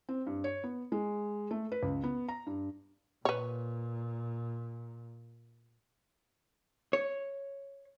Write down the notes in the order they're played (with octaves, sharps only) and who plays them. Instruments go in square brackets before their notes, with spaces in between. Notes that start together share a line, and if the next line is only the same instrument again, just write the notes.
[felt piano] C4
G2
C#5
B3
G#3
A3
B4
C#2
B3
A#5
G2
[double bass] A#2 [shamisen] B4 C#5
[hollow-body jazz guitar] C#5